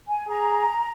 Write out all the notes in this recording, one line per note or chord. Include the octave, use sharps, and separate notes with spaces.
G#5
G#4 A#5